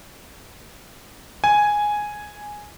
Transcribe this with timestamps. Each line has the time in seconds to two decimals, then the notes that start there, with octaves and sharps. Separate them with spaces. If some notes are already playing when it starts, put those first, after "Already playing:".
1.44 G#5